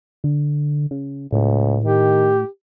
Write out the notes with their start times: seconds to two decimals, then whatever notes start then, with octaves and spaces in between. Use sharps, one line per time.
0.24 D3
0.91 C#3
1.32 C#2 A2
1.84 D#3 G4